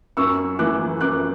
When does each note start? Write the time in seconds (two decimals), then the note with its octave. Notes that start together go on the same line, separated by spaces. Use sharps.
0.17 F#2 C#6 E6
0.59 E3 A3 D6 F#6
1.01 F#2 D6 F#6